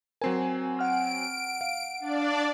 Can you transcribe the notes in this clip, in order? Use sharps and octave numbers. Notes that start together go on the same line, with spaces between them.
F#3 C4 A#4 G#5 C7
F#5 F6 D7
F5
D4 D5